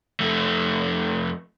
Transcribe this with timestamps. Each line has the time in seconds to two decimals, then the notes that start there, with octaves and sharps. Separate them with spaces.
0.20 F2 A3